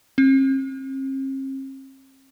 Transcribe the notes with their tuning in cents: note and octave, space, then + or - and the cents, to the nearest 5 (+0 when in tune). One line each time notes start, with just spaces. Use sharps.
C4 +45